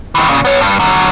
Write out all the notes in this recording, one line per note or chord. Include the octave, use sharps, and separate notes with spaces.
D#3 E3
A#2 C#3
B3 C#5
G2
D3 F#3